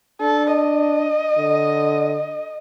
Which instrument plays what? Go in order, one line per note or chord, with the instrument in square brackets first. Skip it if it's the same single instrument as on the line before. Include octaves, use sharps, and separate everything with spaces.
[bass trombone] D4 [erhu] A4
[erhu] D#5
[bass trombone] D3